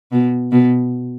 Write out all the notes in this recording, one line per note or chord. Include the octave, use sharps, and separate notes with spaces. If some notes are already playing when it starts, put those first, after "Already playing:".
B2
B2